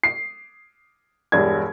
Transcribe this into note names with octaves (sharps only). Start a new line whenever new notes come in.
C7
E1 G2 D4 G#6